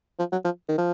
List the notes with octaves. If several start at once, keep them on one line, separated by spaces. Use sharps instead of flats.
F3
F#3
F3
D#3
F3